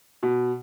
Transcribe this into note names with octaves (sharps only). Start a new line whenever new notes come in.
B2